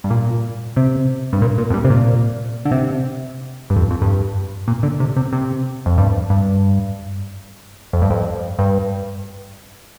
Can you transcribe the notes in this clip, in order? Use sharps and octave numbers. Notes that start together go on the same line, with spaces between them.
G2
A#2
C3
G2
A#2
A#2
F2
G2
C3
A#2
D3
C3
G2
F2
F2
G2
A#2
D3
C3
C3
C3
F2
G2
G2
F2
G2
F2
G2